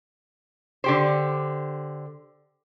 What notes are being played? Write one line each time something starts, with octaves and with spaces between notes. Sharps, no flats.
D3 G4 C5